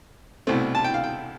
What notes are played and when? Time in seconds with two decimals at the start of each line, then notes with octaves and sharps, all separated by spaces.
0.47 C2 B2 A3 C4
0.75 A5
0.84 G5
0.94 F5
1.04 G5